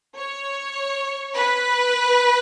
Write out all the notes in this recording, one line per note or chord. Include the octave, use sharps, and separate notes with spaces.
C#5
B4